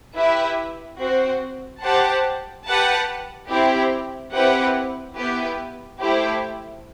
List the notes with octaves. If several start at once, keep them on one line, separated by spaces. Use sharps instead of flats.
E4 G4 B4 E5
C4 F#4 C5
G4 C5 F#5 A5
G4 B4 F#5 A5
C4 E4 G4
C4 E4 G4 B4 F#5
B3 E4 G4 B4
A3 E4 G4 C5